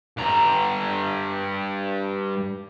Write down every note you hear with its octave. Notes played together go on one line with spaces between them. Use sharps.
G2 A#5